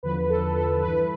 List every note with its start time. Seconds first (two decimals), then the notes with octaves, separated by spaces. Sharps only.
0.03 E2 D3 F3 B4
0.29 A4
0.55 A4
0.82 G2 E3 B4